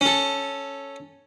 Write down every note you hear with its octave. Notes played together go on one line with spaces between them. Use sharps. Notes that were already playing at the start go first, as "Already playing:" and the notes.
C#4 A4